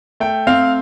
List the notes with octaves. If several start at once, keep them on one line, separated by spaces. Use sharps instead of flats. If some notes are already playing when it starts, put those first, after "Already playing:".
A3 G5
C4 F5